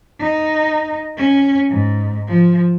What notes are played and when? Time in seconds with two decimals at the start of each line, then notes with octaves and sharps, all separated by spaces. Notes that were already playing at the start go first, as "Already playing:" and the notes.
0.19 D#4
1.17 C#4
1.69 G#2
2.27 F3